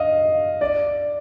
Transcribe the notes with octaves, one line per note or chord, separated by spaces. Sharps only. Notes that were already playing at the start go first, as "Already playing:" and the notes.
Already playing: D#5 F5
D5